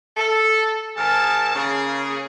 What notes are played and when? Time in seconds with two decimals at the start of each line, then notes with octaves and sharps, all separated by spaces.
0.17 A4
0.97 G#2 D#3 G#4 A#4 A5
1.55 C#3 A#3 G#4